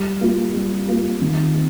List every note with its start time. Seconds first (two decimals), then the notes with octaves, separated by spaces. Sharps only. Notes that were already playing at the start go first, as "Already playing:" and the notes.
Already playing: G3
0.21 A#3 F4
0.54 G3
0.89 A#3 F4
1.21 D#3
1.54 C4